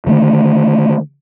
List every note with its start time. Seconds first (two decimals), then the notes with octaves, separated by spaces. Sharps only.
0.07 D3 D#3 A3